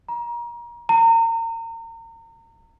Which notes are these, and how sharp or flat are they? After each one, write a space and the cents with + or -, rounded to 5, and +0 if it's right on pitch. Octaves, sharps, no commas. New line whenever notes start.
A#5 +30
A#5 -35